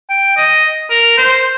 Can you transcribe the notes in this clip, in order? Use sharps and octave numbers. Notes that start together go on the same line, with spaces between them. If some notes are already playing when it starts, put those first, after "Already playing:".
G5
D#5
A#4
C5